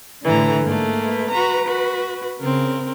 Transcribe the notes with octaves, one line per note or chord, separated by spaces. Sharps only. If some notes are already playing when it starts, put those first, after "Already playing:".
A2 D3 E3 A#5
G#2 A3 A#3
B4
F#4 A#5
F#4
C#3 C4 A#4